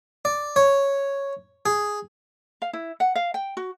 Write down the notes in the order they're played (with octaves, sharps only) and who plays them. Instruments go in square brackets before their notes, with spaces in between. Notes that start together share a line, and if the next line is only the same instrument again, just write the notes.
[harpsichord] D5
C#5
G#4
[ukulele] F5
E4
F#5
F5
G5
F#4